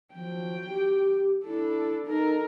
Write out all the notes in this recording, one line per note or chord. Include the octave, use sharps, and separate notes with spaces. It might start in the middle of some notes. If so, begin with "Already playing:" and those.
F3 F#3 G5
G4
D4 E4 A4
D#4 A4 A#4